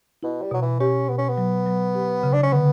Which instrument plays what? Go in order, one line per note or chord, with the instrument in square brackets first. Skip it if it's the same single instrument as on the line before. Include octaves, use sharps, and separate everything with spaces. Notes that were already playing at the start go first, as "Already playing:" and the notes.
[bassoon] B2 [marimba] E4
[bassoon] G3
[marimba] B2 [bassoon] F#3
[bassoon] E3
[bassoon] C#4 [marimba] G4
[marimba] B2 [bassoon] B3
[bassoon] C#4
B3
[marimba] F#3
F#3
G4
C#3
[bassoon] D4
C#4
[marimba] D3 [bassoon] B3